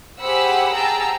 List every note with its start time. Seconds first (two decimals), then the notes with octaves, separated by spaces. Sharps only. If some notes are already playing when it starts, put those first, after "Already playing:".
0.20 G4 G#4 C5 F#5 B5 E6
0.76 G#4 F#5 G5 A5 A#5 E6